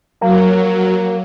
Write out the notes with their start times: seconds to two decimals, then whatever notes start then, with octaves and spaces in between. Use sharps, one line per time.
0.21 F#3 A#3